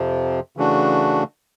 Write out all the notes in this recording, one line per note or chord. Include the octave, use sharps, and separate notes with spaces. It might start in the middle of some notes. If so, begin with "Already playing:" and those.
Already playing: F2 C3 F3
C#3 E3 A3 D4 F#4